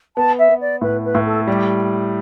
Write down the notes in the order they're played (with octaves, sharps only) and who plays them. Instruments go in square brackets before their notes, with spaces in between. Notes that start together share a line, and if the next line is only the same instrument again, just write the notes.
[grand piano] B3 [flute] A5
[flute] E5
[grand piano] B3
[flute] D5
[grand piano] A2 [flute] B4
[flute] B4
[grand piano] A2
[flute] A4
[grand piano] G3 [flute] G4